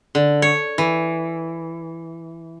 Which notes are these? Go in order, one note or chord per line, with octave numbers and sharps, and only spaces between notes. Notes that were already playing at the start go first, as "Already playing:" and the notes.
D3
C#5
E3